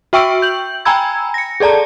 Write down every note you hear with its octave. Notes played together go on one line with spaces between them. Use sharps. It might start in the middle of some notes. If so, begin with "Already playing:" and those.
F#4 E5 G5 C#6 E6 D7
G6 F#7
G5 G#5 A#5 B5 E6 G#6
A#6 C#7
G#4 A4 D5 A5 A#5